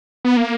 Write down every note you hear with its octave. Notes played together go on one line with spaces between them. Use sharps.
B3
A#3